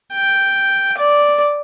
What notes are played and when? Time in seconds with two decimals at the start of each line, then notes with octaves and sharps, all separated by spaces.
0.13 G5
0.97 D5